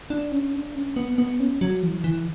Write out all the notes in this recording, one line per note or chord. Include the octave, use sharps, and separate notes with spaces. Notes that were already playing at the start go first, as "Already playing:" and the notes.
D4
C#4
D4
C#4
B3
B3
C#4
F#3
E3
E3